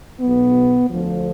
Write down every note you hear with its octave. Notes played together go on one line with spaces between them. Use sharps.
B1 B2 B3
D2 D3 F3